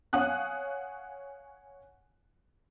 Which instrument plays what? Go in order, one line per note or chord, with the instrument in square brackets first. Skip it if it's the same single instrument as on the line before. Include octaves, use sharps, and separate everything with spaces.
[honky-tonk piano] C#5 F5 F#5 G#5 D#6 F#6